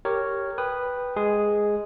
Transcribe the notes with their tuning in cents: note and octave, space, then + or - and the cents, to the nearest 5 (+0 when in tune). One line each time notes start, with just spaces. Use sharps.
G4 +0 A#4 -10 C#5 +0
B4 +0 G5 +0 D#6 -20
G#3 +0 G#4 +0